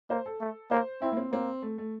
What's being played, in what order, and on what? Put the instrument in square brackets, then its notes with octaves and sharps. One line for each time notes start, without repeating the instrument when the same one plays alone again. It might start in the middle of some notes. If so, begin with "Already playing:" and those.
[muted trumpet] A#3 [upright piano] C5
[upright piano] A4
[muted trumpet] A3
[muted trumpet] A#3 [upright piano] C5
[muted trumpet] C4 [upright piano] E4
[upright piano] A#3
C4
[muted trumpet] A#3 [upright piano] C4
[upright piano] A3
A3